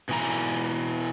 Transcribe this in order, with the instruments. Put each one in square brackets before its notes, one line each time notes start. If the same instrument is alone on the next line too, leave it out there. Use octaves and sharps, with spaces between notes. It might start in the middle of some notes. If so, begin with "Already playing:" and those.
[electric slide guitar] B2 E3 A#5